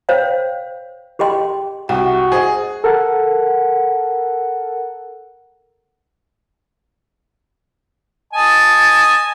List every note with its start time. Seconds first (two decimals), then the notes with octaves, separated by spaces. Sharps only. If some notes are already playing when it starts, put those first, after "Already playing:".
0.09 C5 C#5 F5 G5
1.19 G4 G#4 D#5 G5 C6
1.89 C2 F#4 F#5 G5
2.32 G#4 C5 D#5
2.84 A4 A#4 F#5
8.33 D#5 G#5 A5